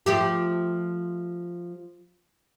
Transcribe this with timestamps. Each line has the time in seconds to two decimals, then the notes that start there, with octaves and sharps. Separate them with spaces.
0.06 F3 A3 G4